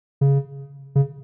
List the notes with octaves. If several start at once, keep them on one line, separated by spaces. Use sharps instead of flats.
C#3
C#3